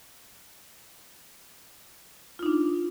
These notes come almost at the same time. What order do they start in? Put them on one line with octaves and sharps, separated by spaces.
F4 D#4 D4